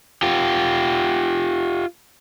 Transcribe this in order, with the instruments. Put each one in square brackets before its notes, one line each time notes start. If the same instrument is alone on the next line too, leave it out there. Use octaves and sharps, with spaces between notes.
[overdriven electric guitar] F4 G4